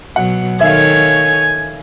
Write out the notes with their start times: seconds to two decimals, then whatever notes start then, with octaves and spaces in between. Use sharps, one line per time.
0.16 B2 F#3 F#5
0.61 D#3 A4 C#5 E5 F5 G#5